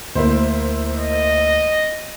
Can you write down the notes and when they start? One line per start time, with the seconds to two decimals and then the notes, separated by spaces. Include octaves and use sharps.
0.15 D2 A#3 E4 C5
0.96 D#5